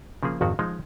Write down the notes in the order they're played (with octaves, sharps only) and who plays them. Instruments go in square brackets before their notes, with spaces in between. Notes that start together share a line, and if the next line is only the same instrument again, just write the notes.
[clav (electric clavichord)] C#3 F3 A#3 G#4
G#1 F2 D#3 F#4
F3 G#3 D#4